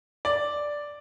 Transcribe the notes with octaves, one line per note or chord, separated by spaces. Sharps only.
D5